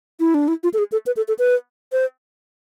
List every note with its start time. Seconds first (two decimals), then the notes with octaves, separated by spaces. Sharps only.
0.20 E4
0.34 D4
0.48 E4
0.63 F4
0.74 A4
0.78 G#4
0.92 A4
1.06 B4
1.17 A4
1.28 A4
1.39 B4
1.92 C5